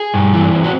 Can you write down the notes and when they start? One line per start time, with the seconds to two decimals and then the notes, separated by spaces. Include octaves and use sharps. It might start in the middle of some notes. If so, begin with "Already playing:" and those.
Already playing: G#4
0.14 G2
0.33 E3
0.52 C4
0.64 F#4